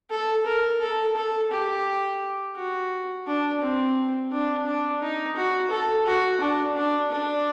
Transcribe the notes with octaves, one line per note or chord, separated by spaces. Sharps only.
A4
A#4
A4
A4
G4
F#4
D4
C4
D4
D4
D#4
F#4
A4
F#4
D4
D4
D4